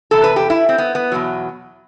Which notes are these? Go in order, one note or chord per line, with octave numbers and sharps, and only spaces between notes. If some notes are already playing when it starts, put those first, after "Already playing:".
E2 C3 A4
B4
G4
E4
C4
B3
B3
E2 B2 F#3